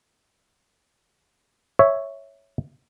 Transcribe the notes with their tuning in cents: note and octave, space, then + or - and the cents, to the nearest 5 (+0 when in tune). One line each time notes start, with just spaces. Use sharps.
C#5 +0 E5 +0